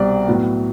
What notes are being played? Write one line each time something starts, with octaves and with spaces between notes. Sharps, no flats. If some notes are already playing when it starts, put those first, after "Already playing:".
Already playing: C2 B2 G3 C4 D5
A2 F#3 B3